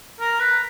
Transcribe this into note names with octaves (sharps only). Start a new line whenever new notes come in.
A#4
B4